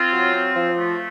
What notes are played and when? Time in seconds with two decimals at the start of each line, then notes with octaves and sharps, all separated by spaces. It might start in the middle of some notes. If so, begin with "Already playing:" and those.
Already playing: C4 F4
0.13 F#3
0.34 C4
0.55 F3
0.77 A3